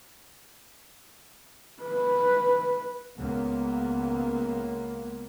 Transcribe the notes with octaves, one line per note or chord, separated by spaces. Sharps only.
B4
C#2 A#3 B3